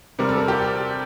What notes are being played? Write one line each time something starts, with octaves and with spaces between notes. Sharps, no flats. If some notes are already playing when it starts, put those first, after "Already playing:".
C3 G3 A#4
A4
A#4
G4